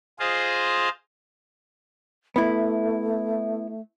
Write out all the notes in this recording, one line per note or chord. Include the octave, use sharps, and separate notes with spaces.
F4 G#4 C5 D#5 F5
A3 B3 E4